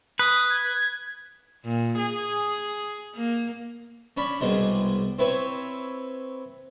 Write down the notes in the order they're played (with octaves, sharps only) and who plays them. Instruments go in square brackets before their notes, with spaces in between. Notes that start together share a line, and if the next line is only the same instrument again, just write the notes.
[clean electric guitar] B4 [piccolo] D#6
[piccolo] G#6
[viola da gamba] A#2
G#4
A#3
[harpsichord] C#4 D4 B5
C2 B2 G#3 D4
C4 E4 B4 C#5